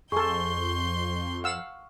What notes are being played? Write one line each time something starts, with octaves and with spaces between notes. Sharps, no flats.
F2 G#4 A4 C6 C#6 G6
F5 F#5 E6